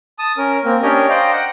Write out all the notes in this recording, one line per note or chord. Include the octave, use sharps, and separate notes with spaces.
A5 D#6
C#4 A#4
A#3 C4
C#4 D4 G4 A#4 C#5 D#5
C5 D5 D#5 F5 G5 A#5
F#5 G5